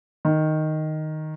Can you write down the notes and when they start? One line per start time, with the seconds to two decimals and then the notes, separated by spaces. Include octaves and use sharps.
0.25 D#3